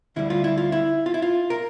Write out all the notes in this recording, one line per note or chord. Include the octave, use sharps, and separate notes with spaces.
D2 D3 G3 D4 E4
F4
E4
F4
E4
F4
E4
F4
A#4